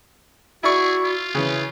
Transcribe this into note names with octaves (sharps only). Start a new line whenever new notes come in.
E4 F#4 G#4 D5 C#6
F4
C#3 E3